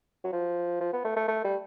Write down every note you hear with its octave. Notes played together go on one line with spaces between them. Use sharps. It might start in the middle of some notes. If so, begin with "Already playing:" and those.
F#3
F3
F3
B3
A3
A3
A3
G3